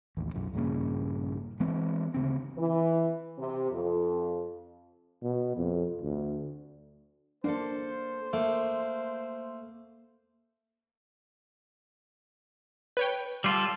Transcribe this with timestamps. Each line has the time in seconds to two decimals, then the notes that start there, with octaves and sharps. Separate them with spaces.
0.17 A1 D#2
0.34 B1 F#2
0.53 A#1 G2 C#3 A#3
1.60 E3 G#3 B3 C4
2.14 D2 C#3 C4
2.58 E3
3.38 C3
3.70 F2
5.22 B2
5.57 F2
6.02 D2
7.44 A#3 D4 A4 C5
8.33 A3 A#3
12.97 B4 C#5 G5
13.44 G3 F4 A4